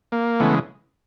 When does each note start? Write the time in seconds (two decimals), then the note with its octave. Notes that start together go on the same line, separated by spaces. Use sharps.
0.12 A#3
0.40 C#3 E3 G#3 A3 B3